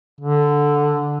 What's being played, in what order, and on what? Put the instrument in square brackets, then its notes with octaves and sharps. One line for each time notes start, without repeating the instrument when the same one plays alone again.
[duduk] D3